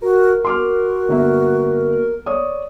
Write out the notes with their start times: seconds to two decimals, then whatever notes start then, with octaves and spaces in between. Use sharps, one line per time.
0.02 F#4 A#4
0.45 F#4 C6 D6 F6
1.09 G1 A#3 E5
2.26 C#5 D5 D#6